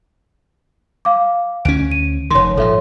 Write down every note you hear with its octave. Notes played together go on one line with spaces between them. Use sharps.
F5 D6
D2 C#4 D7
D#7
F1 D#3 C#5 C6
G#1 A#2 F3 A4 C#5 E5